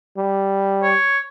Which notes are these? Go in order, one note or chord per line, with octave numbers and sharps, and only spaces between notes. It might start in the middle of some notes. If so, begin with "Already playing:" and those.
G3
C#5